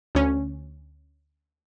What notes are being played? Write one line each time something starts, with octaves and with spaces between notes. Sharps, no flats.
D2 C#4